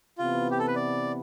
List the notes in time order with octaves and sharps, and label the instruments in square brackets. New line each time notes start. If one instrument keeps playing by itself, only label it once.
[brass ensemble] C3 E3 B3 [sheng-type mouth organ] F4
[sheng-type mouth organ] G4
A4
B4
D5